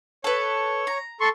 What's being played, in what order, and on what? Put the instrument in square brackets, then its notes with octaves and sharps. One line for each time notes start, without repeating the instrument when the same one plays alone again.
[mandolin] A4 B4 [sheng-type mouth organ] C#5
[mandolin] A#5
[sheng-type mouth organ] A4 C6 C#6